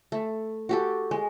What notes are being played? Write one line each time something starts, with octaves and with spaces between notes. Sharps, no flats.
A3
F#4 G4 A4
G#3